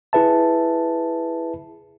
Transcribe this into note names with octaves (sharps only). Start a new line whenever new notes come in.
E4 G#4 B4 E5 A5